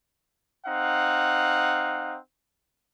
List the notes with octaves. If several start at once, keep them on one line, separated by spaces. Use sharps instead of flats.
C4 D#4 F5 F#5